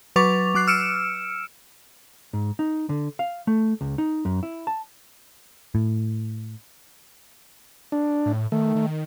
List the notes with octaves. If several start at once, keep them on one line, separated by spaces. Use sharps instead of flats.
F#3 B4 C#6 D6 A6 F7
F#3 D6 F#6 C7
E6 F6 C#7 D7 E7
G#2
D#4
D3
F5
A3
C#2
D#4
F#2
E4
A5
A2
D4
A2
D#3 A3
D#3